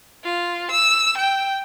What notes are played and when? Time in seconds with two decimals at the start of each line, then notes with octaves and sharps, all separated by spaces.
0.24 F4
0.71 E6
1.17 G5